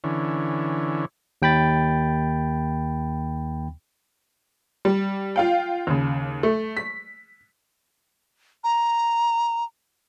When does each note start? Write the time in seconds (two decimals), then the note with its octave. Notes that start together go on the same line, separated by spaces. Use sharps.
0.04 D3 E3 C#4
1.42 D#2 G5 B5 A6
4.85 G3
5.36 F4 F5 G5
5.87 D#2 C#3
6.43 A3
6.77 B6
8.64 A#5